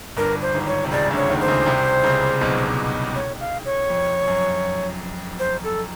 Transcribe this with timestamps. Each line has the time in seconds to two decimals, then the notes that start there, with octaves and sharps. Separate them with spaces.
0.17 G1 G2 A#4
0.42 C5
0.54 G#1 G#2
0.67 C#5
0.84 C3
0.92 C#2 C#3 D5
1.11 D2 D3
1.16 C#5
1.30 D#2 D#3
1.42 C5
1.48 C#2 C#3
1.66 C2 C3
2.04 C#2 C#3
2.41 B1 B2
3.15 C#5
3.40 F5
3.65 C#5
3.90 F2
4.27 F#2
5.39 C5
5.64 A4